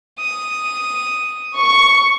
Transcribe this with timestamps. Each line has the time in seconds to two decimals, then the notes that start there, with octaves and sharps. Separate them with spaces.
0.19 D#6
1.55 C#6